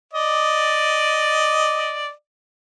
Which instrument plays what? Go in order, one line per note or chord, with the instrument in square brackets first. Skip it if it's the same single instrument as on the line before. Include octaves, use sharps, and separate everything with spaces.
[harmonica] D5 D#5